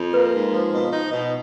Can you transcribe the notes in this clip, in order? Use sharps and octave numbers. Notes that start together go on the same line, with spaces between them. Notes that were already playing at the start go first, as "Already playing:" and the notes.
Already playing: F2
A#3 B4
G#2
F3
B2
D#4
B2